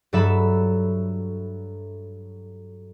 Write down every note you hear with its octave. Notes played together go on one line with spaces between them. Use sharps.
G2 F#3 A4 E5 B5